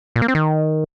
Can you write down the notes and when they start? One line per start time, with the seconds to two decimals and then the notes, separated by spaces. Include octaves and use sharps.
0.16 A#2
0.22 A#3
0.28 C4
0.35 D#3